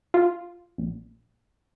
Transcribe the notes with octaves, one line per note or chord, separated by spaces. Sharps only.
F4
A#1